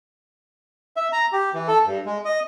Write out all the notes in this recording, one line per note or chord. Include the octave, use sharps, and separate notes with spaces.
E5
A#5
G4
E3
A4
G2
G#3
D#5